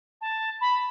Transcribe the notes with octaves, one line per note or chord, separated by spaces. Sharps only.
A5
B5